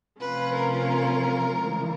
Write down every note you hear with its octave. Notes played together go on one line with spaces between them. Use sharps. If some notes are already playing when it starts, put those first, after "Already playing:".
C3 F3 A3 C#4 F4 B4
A#4
C#3 E3 G#3